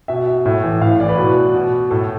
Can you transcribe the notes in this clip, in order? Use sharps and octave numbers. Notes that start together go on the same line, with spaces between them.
B2 E5
E5
A2
E3
A2 F5
E3 D5
B4
B2
B2
A2 A4